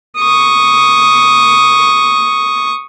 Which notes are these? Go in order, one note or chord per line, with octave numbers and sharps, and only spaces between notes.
C#6 D#6